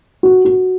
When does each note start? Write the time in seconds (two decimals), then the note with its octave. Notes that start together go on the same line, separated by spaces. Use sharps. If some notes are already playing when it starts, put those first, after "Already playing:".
0.23 F#4
0.45 F#4